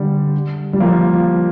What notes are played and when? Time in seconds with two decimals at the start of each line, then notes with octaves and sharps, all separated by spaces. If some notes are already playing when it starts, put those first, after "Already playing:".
Already playing: D3 G3
0.73 G3
0.80 F3 A#3